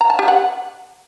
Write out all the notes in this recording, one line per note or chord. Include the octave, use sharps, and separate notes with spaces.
A#5
A5
G4
F#5